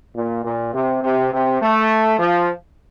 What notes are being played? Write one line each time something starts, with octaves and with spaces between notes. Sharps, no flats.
A#2
A#2
C3
C3
C3
A3
F3